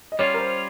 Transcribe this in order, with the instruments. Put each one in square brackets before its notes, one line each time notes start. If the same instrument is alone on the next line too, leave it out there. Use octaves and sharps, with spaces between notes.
[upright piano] D#5
[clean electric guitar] G3 C#4 F4 [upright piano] C#5
[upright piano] A#4
C5